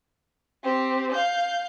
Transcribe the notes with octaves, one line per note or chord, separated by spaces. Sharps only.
C4 G4
F5 G6